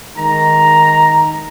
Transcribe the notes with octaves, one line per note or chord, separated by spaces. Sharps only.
D#3 G#3 A#5